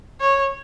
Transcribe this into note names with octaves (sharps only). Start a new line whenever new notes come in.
C#5